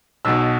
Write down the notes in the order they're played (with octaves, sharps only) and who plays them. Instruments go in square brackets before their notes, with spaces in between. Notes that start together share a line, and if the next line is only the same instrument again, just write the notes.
[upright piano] B1 B2 E6